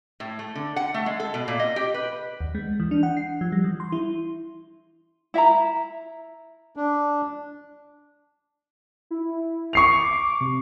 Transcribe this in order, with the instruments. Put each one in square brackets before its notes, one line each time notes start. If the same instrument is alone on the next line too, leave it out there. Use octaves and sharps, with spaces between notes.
[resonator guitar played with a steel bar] A2
A3
D3
F#5
A3
G#3
A4
B2
A#2
D#5
G4
B4
[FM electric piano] D#2
G#3
E3
D4
F#5
C7
F3
G3
E3
C6
E4
[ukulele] E4 E5 F5 A#5
[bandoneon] D4
[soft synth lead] E4
[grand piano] C#6 C7 F7
[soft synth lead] D6
C3